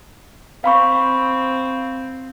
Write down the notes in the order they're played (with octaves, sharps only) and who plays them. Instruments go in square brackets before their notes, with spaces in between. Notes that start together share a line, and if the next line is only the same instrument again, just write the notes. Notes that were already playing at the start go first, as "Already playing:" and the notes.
[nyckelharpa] C4 [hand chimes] F5 B5 C#6